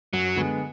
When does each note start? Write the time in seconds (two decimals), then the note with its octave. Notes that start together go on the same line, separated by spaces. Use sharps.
0.13 F#2 F#3
0.36 D3 G#3 B3